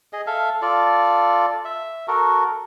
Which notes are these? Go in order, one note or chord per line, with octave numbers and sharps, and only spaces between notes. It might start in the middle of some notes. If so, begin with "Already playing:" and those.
G#4 D#5
A4 E5 F5
F4 A4 D5
E5
F#4 A4 A#4